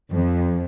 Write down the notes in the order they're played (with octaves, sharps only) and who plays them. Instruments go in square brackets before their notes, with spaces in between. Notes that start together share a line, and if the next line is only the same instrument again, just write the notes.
[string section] F2